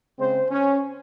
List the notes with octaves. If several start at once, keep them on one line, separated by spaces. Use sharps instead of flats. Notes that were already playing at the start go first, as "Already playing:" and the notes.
C#3 G#3 C4 C5
C#4